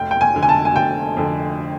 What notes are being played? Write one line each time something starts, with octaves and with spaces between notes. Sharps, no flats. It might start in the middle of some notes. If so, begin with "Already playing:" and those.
Already playing: F1 G5
G5
G#5
F2 D3
G#5
A5
G#5
F1 G5
F2 D3